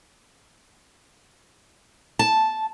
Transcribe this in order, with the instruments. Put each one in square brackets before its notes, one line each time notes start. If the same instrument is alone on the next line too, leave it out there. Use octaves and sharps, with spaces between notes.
[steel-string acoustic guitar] A5